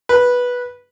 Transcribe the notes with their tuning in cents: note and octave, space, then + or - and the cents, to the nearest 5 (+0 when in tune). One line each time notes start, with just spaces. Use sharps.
B4 -10